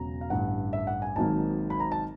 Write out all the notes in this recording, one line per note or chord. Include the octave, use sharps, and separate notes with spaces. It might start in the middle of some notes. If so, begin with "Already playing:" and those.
Already playing: E1 E2 C#3 F#3 A#5
F5
A1 G2 D3 F#5
E5
F#5
G#5
G#1 G#2 D#3 F#3 A#3 A5
B5
A#5
A5